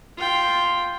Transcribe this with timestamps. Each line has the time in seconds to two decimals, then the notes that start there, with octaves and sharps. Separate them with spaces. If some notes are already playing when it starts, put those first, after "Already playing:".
0.17 F4 G5